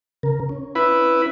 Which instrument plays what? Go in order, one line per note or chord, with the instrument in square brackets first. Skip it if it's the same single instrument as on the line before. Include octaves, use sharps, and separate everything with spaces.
[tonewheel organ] C#3 A#4
C#4
[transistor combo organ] E4 B4